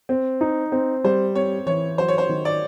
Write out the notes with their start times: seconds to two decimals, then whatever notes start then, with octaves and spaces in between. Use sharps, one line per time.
0.09 C4
0.41 D#4
0.72 C4
1.04 G3 C5
1.35 C4 C#5
1.66 E3 C#5
1.98 F#3 C5
2.08 C#5
2.18 C5
2.29 D#3
2.45 D5